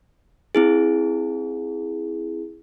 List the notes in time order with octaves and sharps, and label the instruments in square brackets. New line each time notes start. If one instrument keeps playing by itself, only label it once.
[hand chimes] C4 E4 G#4